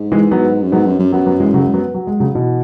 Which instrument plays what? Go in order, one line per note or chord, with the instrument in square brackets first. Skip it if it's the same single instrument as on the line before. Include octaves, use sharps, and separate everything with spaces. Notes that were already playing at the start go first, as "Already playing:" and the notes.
Already playing: [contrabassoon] G#2
[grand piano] E3 G#3
F#3 B3
[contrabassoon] F#2
[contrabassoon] G#2 [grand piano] F#3 B3
[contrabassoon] F#2
F#2
[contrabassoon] F#2 [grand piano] F#3 B3
[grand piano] F#3 B3
E3 G#3
C#3 F#3
G#3
F#3 B3
F#3
G#3
C#3 F#3
B2 E3